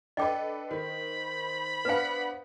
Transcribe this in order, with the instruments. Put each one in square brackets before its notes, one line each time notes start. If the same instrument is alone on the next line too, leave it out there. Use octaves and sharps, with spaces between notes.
[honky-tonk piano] D4 A4 B4 [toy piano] D#5 G5 D6
[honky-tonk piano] D#3 [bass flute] C5 [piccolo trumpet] B5
[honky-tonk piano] B3 D4 F#5 [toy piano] B4 F5